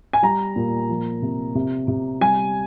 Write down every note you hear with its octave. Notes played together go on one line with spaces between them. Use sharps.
G#5
G3 A#5
A#2
F3
C3
C3
C3
G3 G#5